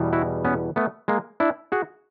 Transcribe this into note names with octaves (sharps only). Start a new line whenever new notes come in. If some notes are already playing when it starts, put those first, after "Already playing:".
Already playing: E2 B2 G3
E4 F#4
B3 C#4
A3 B3
G#3 A#3
D4 E4
F#4 G#4